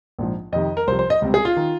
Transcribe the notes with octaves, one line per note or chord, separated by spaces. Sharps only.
A#1 G#2 F3
F2 C3 D#3 D#5
A#4
C2 C3 F3 C5
C5
D#5
C#2 C3 G3 C4
G#4
F4
D#3